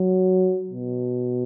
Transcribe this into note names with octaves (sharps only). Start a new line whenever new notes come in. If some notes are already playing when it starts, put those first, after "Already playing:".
Already playing: F#3
B2